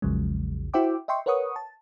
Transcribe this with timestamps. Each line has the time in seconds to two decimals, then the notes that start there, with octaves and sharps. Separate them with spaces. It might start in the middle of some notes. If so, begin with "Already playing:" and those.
0.02 A#1 E2 C#3 F3 F#3 G#3
0.74 E4 F#4 C5 E5 G5 D6
1.08 D#5 E5 G5 C6 C#6
1.26 A#4 B4 C#5 F#5 C#6 D#6
1.56 A5